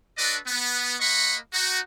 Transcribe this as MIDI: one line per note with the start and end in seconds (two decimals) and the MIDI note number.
0.18 0.36 62
0.18 0.36 66
0.18 0.36 69
0.18 0.36 71
0.18 0.36 74
0.18 0.36 75
0.47 0.94 59
0.99 1.35 58
0.99 1.35 75
0.99 1.35 78
0.99 1.35 83
0.99 1.35 85
1.53 1.79 63
1.53 1.79 66